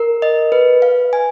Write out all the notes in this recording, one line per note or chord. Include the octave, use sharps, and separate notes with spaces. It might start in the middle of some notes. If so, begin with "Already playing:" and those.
Already playing: A#4
D#5
B4
F5
G#5